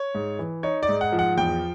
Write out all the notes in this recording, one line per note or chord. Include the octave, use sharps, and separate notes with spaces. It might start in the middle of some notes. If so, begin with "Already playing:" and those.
Already playing: C#5
G#2
E3
D#4 C#5
D5
G#2
F#5
F3
F#5
E2 G5